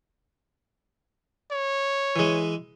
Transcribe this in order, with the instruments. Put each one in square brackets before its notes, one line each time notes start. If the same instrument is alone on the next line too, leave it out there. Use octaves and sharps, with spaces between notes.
[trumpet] C#5
[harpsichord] E3 G#3